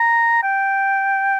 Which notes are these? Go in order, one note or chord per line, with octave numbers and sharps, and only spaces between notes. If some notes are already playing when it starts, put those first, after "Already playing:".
Already playing: A#5
G5